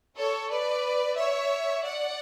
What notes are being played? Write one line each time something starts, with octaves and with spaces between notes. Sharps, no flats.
A4 C#5
B4 D5
C#5 E5
D5 F#5